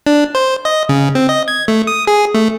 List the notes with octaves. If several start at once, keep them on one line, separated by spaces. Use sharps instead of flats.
D4
C5
D#5
C#3
C4
D#5
G#6
A3
D#6
G#4
A3